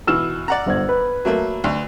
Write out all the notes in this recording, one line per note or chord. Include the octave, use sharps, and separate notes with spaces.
B2 E3 E6 F6 E7
D5 F#5 A#5
G1 C5 G#6
B4
F#3 A3 A#3
D2